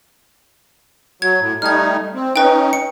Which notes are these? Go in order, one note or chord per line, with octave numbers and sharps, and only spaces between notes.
F#3 G#6
A2
G3 A3 D#4 F6 G#6
C4
C#4 D#4 B4 G5
C#7